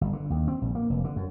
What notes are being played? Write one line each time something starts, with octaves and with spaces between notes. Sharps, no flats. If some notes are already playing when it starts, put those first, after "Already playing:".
G1
D3
D#2
C4
A#1
A#3
F1
D3
F#2